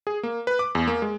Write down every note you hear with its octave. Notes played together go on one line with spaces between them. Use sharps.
G#4
A#3
B4
D6
E2
A#3
G#3